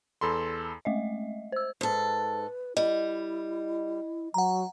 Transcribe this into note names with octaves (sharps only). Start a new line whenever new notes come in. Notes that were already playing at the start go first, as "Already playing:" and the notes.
E2 A4 B5 C6
G#3 A3 D#5 E5
C5 E6
G#2 A4 B4
G3 E4 D#5
F#3 F#5 A#5